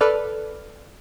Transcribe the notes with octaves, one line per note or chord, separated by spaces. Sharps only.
A4 B4 D5 F6